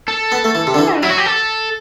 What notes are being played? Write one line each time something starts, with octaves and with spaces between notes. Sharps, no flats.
A4
B3
A3
E3
C3
D3
E3
D4
F#3 E4
F#4
G4
A4